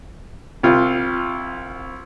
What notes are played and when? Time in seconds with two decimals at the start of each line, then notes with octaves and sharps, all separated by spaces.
0.63 C2 F4